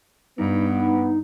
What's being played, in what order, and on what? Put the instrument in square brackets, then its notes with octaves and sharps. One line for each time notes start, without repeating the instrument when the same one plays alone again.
[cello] G2 [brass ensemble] B3 [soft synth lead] D#4